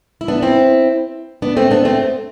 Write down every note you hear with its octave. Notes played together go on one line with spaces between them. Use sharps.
E4
B3 D4
C4 E4
B3 D4
A3 C4
B3 D4
A3 C4